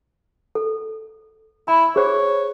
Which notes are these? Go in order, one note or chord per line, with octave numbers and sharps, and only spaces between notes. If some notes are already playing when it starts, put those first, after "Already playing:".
A4
E4 B5
G#4 C5 C#5